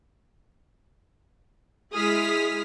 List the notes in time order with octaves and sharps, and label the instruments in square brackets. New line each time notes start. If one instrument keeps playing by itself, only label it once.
[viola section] G#3 E4 G#4 [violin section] D#6 F6 B6